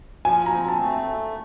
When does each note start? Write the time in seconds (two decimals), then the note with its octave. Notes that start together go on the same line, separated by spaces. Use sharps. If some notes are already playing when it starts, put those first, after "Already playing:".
0.25 F3 G#5
0.46 A#5
0.54 C4
0.68 A5
0.82 A3